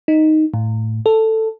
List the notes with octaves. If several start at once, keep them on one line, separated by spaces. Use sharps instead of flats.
D#4
A2
A4